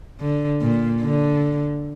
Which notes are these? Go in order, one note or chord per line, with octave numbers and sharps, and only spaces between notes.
D3
A#2
D3